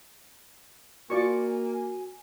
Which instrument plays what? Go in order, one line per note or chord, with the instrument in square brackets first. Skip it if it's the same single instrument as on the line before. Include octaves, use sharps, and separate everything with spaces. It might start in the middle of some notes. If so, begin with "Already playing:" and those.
[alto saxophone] A#3 [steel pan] F4 D5 C#6 [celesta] F#4 [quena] G#5